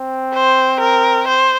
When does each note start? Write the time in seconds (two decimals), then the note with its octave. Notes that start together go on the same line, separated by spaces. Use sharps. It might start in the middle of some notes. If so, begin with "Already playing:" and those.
Already playing: C4
0.34 C5
0.80 A#4
1.28 C5